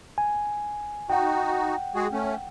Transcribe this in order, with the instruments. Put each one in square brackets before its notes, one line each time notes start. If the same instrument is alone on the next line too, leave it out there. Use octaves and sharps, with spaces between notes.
[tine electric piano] G#5
[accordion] D#4 F#4 [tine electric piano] F#5 G5
[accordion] G#3 F#4 G#4
A3 C#4